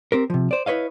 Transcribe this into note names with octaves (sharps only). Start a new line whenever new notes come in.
C4 G4 A#4
C3 F3
C5 D5
E4 B4 C#5 D#5 F5